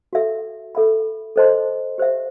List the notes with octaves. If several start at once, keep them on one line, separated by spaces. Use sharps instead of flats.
F#4 A4 E5
A4 E5 B5
A4 C5 D#5 A5 C6
G4 C5 E5